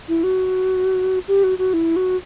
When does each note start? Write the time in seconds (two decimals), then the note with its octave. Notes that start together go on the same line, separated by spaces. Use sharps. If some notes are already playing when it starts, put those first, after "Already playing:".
0.08 E4
0.23 F#4
1.28 G4
1.43 F#4
1.58 F#4
1.73 E4
1.96 F#4